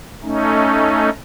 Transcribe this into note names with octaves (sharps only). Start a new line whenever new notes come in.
A3 C#4 D#4